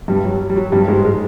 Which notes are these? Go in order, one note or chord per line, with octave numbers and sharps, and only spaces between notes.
G2 G3
F#3
G3
F#3
G2 G3
G#2 G#3
G#3